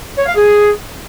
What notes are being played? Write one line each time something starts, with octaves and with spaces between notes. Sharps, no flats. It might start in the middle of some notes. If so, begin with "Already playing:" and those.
C#5
F5
G#4